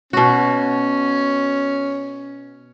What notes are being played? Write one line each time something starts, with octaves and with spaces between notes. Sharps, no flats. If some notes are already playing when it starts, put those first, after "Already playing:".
B2 C#4 F#4